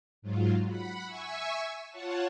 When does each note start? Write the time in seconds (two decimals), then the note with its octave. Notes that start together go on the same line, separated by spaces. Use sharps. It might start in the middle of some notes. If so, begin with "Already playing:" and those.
0.22 G#2 F#3 F4
0.67 F#5 B5
1.05 E5 G#5 C#6 E6
1.90 F4 C#5 F#5 A5